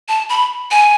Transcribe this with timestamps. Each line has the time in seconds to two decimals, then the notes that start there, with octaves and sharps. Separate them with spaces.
0.09 A5
0.29 B5
0.71 G#5